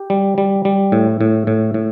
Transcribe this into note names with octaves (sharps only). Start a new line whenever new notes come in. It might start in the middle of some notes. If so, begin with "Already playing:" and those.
Already playing: G4
G3
G3
G3
A2
A2
A2
A2